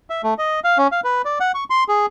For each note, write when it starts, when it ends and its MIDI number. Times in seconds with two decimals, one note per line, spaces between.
0.10 0.22 76
0.23 0.34 57
0.38 0.60 75
0.64 0.78 77
0.78 0.87 61
0.92 1.00 77
1.04 1.22 71
1.25 1.39 74
1.40 1.52 78
1.54 1.64 85
1.70 1.84 84
1.88 2.06 68